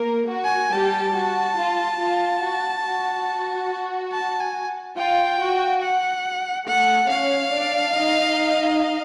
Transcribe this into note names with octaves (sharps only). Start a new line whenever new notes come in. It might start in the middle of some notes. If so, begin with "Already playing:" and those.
Already playing: A#3 A#4
F#4
G#5
G3 G4 A5
F#4
F4
F4
F#4
F#4
A5
G#5
F4 G5
F#4
F#5
A3 A4 F#5
C#4 C#5 F5
D4 D5
D#4 D#5